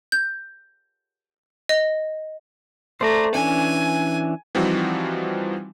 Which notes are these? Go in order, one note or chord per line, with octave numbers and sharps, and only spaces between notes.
G6
D#5
A3 C5 D5 A#5
E3 C#4 D4 G#5
E3 F3 G3 C4 D#4 F#4